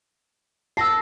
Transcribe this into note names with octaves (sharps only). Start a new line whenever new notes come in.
A5 E6 A#6 C7